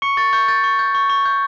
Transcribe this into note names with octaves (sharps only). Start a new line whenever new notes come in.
C#6 C#7
C#6 A6
C#6 G6
G6 A6
C#6
G6
C#6
C#6
G6